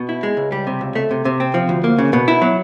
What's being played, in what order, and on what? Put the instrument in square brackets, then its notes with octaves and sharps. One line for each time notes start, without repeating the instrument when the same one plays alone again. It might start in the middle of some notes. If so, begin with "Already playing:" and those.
Already playing: [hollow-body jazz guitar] B2
E4
G#3
C#2
G3
C3
C#2
A3
C3
C3
C4
F3
D2
A#3
C#3
B2
E4
F#3